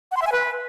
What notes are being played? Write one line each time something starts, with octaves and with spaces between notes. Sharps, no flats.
F#5
C6
E5
G#5
B4